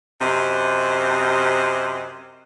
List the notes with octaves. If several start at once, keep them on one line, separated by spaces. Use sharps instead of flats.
F#2 C3 C5 D#5